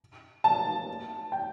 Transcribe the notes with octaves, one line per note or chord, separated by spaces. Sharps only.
A5
G5